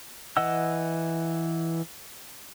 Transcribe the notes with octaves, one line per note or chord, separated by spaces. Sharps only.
E3 D#5 F#5 E6